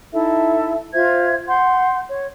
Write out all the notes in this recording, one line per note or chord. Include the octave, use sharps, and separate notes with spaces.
D#4 E4 A4 E5
F4 C5 E5 G#6
F#5 C6 G6
C#5